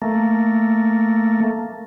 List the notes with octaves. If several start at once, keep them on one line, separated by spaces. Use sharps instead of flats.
A3 A#3